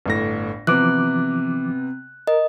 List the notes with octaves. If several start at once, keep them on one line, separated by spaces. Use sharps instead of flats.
G1 A2 A#6
C3 E3 F3 B3 D6 F#6
A#4 D#5